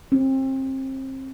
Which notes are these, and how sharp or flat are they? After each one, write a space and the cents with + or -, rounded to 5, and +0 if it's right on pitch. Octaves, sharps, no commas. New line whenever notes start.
C4 +30